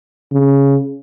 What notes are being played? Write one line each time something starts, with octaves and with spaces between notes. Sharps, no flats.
C#3